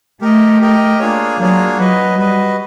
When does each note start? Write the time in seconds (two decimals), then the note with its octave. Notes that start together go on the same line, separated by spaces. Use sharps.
0.21 A3 G4 A#4 D#5 G5
0.60 G4 A#4 D#5 G5
0.99 A#3 D4 F4 G#4 C#5
1.39 F#3 A#3 D4 F4 G#4 C#5
1.77 F#3 F#4 B4 D#5
2.17 G3 F#4 B4 D#5